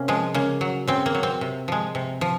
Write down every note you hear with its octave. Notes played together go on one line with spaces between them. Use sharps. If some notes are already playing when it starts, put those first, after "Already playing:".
Already playing: C3 A#3 C#4
F3 G#3
C#3 A#3
F#3
C#3 C4
A#3
F#3
C4
C3
F3 G#3
C3
F3